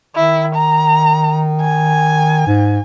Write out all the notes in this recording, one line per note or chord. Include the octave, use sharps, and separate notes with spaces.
D#3 E4
A#5
G#5
G#2